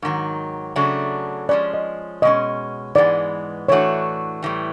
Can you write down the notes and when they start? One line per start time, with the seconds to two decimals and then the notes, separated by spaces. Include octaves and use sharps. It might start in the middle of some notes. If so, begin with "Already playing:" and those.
0.02 G#2 D#3 F#3
0.76 C#3 F#3 A3 D4
1.49 F3 G#3 C#4 D5
1.74 D#5
2.22 B2 G#3 C#4 D#5
2.95 G#2 E3 G#3 B3 D5
3.68 A2 E3 A3 D4 F#4 C#5
4.42 A2 E3 G3